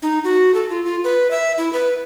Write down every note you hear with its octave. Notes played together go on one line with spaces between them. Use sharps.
D#4
F#4
A4
F4
F4
B4
E5
E4
B4